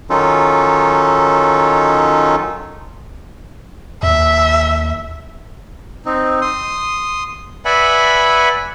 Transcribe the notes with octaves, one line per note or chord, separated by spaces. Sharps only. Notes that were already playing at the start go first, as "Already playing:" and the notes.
D#3 F#3 C#4 D#4 F4 A4
D#2 E5
C4 D#4
C6 D#6
B4 D5 E5 F#5 G#5 B5